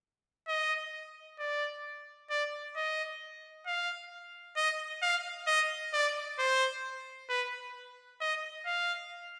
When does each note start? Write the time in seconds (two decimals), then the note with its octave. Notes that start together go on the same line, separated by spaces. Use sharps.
0.48 D#5
1.39 D5
2.30 D5
2.76 D#5
3.66 F5
4.56 D#5
5.02 F5
5.47 D#5
5.93 D5
6.39 C5
7.29 B4
8.21 D#5
8.66 F5